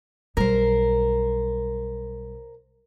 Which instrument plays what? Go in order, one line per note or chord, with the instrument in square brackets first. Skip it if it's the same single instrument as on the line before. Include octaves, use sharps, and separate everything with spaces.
[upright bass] B1 G3 [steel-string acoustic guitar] A#4 C5